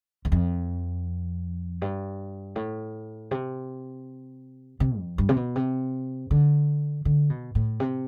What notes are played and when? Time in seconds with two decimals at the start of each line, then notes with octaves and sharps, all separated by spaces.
0.25 E2
0.32 F2
1.82 G2
2.56 A2
3.31 C3
4.80 C3
4.99 F2
5.18 G2
5.29 C3
5.36 B2
5.56 C3
6.31 D3
7.05 D3
7.30 B2
7.55 A2
7.80 C3